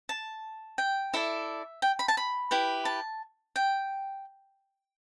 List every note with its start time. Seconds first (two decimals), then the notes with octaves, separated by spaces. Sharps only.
0.09 A5
0.78 G5
1.14 E4 A4 D5 E5
1.82 G5
1.99 B5
2.08 A5
2.17 B5
2.51 E4 G4 B4
2.85 A5
3.56 G5